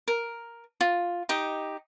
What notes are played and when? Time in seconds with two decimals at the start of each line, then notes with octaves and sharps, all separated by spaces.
0.08 A#4
0.81 F4
1.29 D#4 G4 D#5